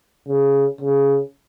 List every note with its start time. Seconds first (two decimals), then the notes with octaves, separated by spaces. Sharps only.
0.28 C#3
0.81 C#3